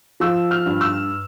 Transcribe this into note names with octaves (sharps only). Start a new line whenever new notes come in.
F3 E6
F6
G2
E6